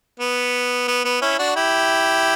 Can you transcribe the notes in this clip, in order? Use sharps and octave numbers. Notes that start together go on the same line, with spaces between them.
B3
B3
B3
C#4 E4
D4 F#4
E4 G4